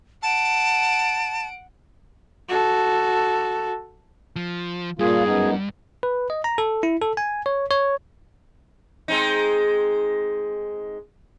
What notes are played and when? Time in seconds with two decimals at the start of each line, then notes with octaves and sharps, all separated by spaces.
0.23 F#5 A5 D7
2.49 F#4 A4
4.36 F3
4.99 G2 A#2 A#3 F4 G#4
5.25 F#2 B3 D#4
6.03 B4
6.30 D#5
6.44 A#5
6.58 A4
6.83 E4
7.01 A4
7.17 G#5
7.46 C#5
7.71 C#5
9.08 G#3 C4 D#4